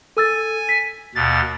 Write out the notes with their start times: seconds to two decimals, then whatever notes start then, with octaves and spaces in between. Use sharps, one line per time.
0.17 A4 G#5 E6 A6
0.69 B6
1.15 D#2 B2 A6